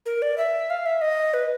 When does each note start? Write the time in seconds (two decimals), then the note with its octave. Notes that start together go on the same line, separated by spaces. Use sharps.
0.06 A#4
0.22 D5
0.38 E5
0.70 F5
0.86 E5
1.01 D#5
1.34 B4